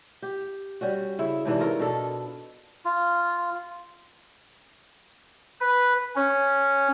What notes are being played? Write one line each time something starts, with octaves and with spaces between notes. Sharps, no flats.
G4
G3 C#4 F#4
C#3 E4 C#5
G#2 C3 E3 D4
F4 A#4 C#5
B2 D4 A4
F4
B4
C#4